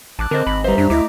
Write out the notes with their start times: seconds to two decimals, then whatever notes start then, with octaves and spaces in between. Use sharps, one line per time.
0.19 A1 A5 D6 F#6
0.31 D3 C4 A#4 C5 D#5
0.47 G#1 B5
0.64 G3 B4 C5 E5 A#5
0.78 F#2 D4 B6
0.90 D2 A3 E4 D#5 D6